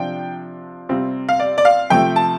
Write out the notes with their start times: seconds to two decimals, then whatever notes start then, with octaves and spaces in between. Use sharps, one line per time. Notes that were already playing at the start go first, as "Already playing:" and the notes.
Already playing: C3 F3 D4 F4 G5
0.89 C3 G3 C4 F4
1.29 F5
1.40 D5
1.58 D5
1.65 F5
1.90 C3 F3 A3 G5
2.16 A5